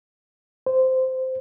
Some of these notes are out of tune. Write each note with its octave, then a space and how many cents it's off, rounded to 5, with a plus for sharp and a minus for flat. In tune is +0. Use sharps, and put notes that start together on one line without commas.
C5 -10